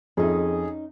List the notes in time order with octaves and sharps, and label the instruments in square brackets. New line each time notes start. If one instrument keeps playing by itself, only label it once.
[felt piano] F2 [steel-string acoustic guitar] C#4 D#4 [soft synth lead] G#4